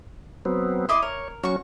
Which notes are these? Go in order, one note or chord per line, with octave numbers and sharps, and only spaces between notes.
F#3 B3 C4
E4 D#5 C6 D6
A#4 C#5
F#3 C#4 F#4 C#6